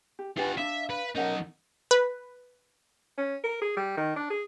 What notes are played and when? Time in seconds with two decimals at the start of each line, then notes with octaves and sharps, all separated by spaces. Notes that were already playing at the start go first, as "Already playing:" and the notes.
0.19 G4
0.37 D4 F4 G4 B4 F#5 G#5
0.57 D4 E5 F5 B5
0.90 B4
1.15 B1 C#4 D#4 A#4 F#5 A5
1.91 B4
3.18 C#4
3.44 A#4
3.62 G#4
3.77 G3
3.97 D#3
4.16 D4
4.31 G#4